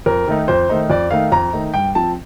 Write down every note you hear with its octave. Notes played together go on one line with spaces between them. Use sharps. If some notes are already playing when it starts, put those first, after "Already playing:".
F2 A#4
D#3 A3 D#4
F2 C5
D#3 A3 D#4
F2 D5
D#3 A3 D#4 F5
F2 A#5
D#3 A3 D#4
G2 G5
F3 C4 A5